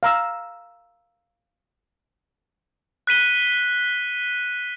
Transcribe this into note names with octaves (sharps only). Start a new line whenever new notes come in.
F5 A#5 E6
F#6 B6 D#7 G7